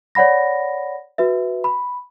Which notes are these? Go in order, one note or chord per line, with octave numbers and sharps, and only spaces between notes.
C#5 D5 F#5 B5 A#6
F#4 B4 E5
B5